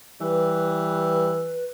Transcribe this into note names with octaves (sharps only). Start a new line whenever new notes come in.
E3 G3 B4